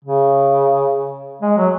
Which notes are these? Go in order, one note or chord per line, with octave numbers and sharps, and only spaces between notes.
C#3
G#3
F#3